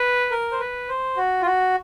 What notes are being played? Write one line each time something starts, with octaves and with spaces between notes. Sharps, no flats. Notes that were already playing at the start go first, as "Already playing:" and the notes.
Already playing: B4
A#4
C5
B4
C5
F#4
F4
F#4